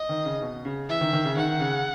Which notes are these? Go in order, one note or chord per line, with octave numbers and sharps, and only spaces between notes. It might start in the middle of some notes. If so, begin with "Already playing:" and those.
Already playing: D#5
D#3
C#3
B2
C#3
E3 E5
D#3
D#3
C#3
D#3 F#5
C#3